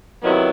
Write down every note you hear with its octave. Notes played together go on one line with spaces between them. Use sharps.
C3 D#3 F#3 B3 E4